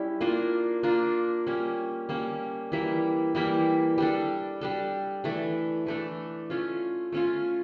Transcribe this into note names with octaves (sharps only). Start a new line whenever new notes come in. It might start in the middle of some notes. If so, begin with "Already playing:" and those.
Already playing: G3 C#4 E4
A#3 D4 F4 A#4
A#3 D4 F4 A#4
G3 A#3 C#4
G3 A#3 C#4
E3 G3 A#3 E4
E3 G3 A#3 E4
G3 D4 A4
G3 D4 A4
E3 A3 D4 A4
E3 A3 D4 A4
A3 C#4 F4
A3 C#4 F4